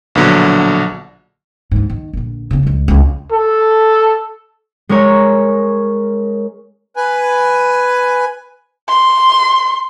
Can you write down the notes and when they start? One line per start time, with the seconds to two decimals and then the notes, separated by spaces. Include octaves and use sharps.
0.15 A#1 B2 D3 F#3
1.71 G#2 D#3
1.90 D#3
2.13 A#1 D3
2.51 C#3 C4
2.63 C#2 G#3
2.88 C#2 C4
3.32 A4
4.89 G#3 C#4 A#4 C#5
6.96 B4 G#5
8.89 C6